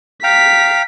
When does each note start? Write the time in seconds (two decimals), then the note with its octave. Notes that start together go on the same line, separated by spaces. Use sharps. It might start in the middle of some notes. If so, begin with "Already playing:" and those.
0.23 F5 G5 A#5 B6